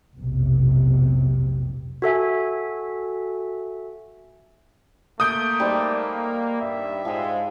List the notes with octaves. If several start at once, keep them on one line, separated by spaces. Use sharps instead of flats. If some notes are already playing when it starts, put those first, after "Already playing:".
F1 B1 C3
F#4 A4 E5 G#5
A3 A#3 D#6 G6 D7
G3 D#4 C5
G2 E5
G#2 F3 G#3 G5